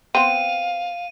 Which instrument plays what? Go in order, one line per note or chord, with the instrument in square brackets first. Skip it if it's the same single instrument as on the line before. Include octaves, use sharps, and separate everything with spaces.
[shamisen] B3 C4 [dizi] F5 [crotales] D#7